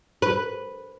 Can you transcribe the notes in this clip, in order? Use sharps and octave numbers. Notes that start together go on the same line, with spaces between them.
B4